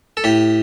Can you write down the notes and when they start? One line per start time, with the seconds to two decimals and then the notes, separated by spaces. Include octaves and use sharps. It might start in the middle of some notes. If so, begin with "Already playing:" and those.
0.17 A4
0.24 A2 G4